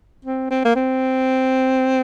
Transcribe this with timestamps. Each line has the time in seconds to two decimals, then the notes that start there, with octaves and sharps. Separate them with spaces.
0.25 C4
0.50 C4
0.65 A#3
0.76 C4